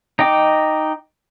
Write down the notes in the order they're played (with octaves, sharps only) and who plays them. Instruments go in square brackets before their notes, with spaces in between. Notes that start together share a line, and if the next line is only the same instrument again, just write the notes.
[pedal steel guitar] D#4 D#5 G5 D6